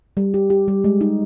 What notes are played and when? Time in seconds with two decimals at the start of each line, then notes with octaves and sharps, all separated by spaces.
0.17 G3
0.34 G4
0.50 G4
0.68 G3
0.84 G#3
1.01 D#4